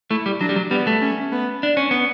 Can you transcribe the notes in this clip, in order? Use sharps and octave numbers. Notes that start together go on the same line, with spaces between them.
A3 E4
G3
F#3 D4
G3
F#3
G3 B3
A3
C#4
B3
D4
C#4
B3